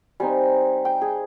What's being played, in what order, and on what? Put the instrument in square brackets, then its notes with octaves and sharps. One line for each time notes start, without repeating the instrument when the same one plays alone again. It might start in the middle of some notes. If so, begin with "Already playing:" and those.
[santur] G3 C4 D#4 G#5
G5
G#4